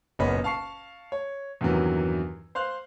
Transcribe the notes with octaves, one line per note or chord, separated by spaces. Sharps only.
F#1 A#2 B3 C#5 D#5 B5
F5 A5 C#6 C7
C#5
E2 G2 C3 D#3 E3 F#3
C5 F5 C6 F#6